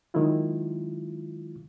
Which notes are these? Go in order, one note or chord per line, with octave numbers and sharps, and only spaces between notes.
D#3 F#3 G#3 E4 F4